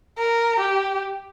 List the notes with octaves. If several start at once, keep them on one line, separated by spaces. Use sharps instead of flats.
A#4
G4